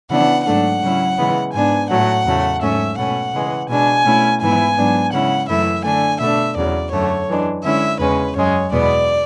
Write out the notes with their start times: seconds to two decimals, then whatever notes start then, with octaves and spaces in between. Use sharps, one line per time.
0.10 C#3 E3 B3 D4 F#5
0.46 G#2 F#3 A3 D4 F#5
0.82 C#3 F#3 C#4 E4
1.18 C#3 E3 G#3 B3
1.53 G#2 G#3 B3 D4 G#5
1.90 A2 F#3 A3 F#5
2.25 E2 C#3 F#3 A3
2.61 G#2 F#3 A3 C#4 E5
2.98 B2 A3 C#4 F#5
3.33 C#3 E3 G#3
3.69 B2 G#3 D4 G#5
4.05 B2 A3 C#4 E4
4.41 G#2 E3 B3 E4 G#5
4.77 G#2 F#3 B3 D4
5.13 C#3 G#3 C#4 E4 F#5
5.49 F#2 E3 A3 E4 E5
5.84 D3 A3 D4 G#5
6.21 B2 A3 D4 E5
6.56 E2 C#3 F#3 D5
6.92 F#2 D3 A3 C#5
7.28 F#2 E3 G#3 D4
7.64 D3 G#3 C#4 E4 E5
8.00 E2 C#3 G#3 C#4 B4
8.36 F#2 C#3 G#3 C#5
8.72 E2 B2 G#3 B3 D5